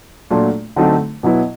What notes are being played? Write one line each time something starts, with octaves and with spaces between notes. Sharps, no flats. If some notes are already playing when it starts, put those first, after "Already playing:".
A#2 F#3 A3 D4 F4
D3 F#3 A3 C4 D#4
B2 F#3 B3 E4